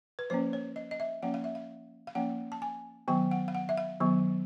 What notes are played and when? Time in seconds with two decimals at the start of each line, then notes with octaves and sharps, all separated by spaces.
0.19 B4
0.30 F3 A#3 C#4 C5
0.53 C#5
0.76 D#5
0.91 D#5
1.00 E5
1.23 F3 A#3 C#4 F#5
1.34 F5
1.44 E5
1.55 F5
2.07 F5
2.15 F3 A#3 C#4 F#5
2.52 A5
2.62 G#5
3.08 D#3 F#3 B3 G5
3.31 F#5
3.48 F5
3.55 F#5
3.69 E5
3.77 F5
4.00 D#3 F#3 B3